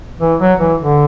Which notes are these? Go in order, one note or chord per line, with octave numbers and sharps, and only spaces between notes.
E3
F#3
E3
D3